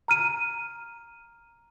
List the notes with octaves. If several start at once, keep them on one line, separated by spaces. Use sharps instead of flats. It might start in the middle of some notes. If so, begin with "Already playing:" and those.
A#5 F6 D#7